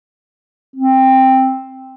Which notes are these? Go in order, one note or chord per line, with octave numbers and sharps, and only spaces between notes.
C4